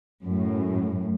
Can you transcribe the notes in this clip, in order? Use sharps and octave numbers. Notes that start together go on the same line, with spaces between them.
F#2 A2